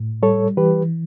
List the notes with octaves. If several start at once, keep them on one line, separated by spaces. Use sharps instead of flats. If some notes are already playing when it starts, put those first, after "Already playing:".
Already playing: A2
G3 A4 C#5
E3 G4 B4